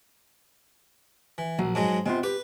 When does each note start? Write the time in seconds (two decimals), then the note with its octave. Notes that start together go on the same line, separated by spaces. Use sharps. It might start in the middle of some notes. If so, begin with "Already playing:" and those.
1.38 E3
1.59 A#1 F#3
1.75 G#2 F#3 G#3 A5
2.06 C3 G#3 B3 F4
2.23 G4 B4